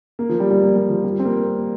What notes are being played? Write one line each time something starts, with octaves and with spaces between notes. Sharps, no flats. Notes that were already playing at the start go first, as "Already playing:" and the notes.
A#3
F3
G3
G3
A#3
G3
F3
G3
C4
A#3